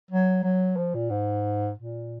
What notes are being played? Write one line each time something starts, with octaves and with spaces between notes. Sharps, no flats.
F#3
F#3
F3
A#2
G#2
A#2